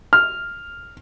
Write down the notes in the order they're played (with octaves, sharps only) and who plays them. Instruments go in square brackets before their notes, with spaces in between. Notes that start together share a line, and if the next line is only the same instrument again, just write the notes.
[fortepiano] F6